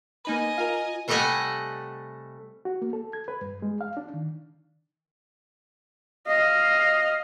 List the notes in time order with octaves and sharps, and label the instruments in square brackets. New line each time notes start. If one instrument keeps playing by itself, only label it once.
[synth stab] A#3 D#4 B4 [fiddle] D#5 G#5
[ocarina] F4 [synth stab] A#4 F5
[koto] C3 G3 A3 D#5 F#5 G#5
[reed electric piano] F#4
A#3
A4
G#6
B4
G2
G#3
F5
D4
D#3
[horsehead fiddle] D#5 F5